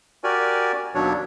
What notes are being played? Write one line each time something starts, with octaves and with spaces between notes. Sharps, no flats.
F#4 G4 A#4 D5 G#5
D#2 B2 F#3 D4 C#5